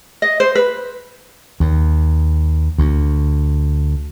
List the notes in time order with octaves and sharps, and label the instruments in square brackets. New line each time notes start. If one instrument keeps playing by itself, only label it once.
[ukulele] D#5
C5
B4
[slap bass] D#2
D2